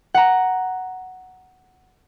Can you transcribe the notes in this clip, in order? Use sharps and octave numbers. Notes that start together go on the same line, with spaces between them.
F#5 A#5